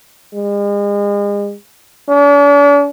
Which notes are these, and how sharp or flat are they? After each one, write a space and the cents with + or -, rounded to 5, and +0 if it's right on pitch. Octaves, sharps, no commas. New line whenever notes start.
G#3 -40
D4 -45